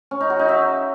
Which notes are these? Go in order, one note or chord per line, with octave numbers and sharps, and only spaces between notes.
C#4
D#4
F#4
D#4
E5